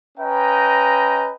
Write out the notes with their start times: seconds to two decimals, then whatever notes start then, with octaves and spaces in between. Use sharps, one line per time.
0.18 C#4 B4 D#5 G5 A#5